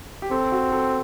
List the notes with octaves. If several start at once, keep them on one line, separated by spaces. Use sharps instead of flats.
G4
C4 A4
F#4
A4